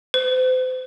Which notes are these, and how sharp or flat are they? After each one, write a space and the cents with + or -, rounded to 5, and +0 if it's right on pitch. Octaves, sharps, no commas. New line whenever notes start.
C5 -35